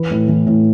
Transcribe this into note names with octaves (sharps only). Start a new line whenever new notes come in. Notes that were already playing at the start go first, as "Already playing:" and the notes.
Already playing: E3 B4
A2
E3
A2